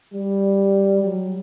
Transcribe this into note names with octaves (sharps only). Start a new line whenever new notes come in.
G3
F#3